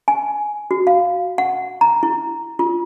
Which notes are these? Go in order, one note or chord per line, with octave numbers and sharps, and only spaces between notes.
G#5
F#4
F5
F#5
A#5
E4
F4